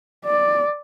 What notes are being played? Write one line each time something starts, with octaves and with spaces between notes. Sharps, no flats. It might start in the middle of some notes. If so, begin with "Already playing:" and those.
D5